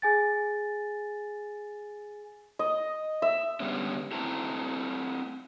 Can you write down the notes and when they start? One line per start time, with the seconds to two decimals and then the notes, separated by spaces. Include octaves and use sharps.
0.02 G#4 G#5 A6
2.59 D#5
3.22 E5
3.60 D3 G3 G#3 B3 C#4
4.12 A3 C4 E4 A5 A#5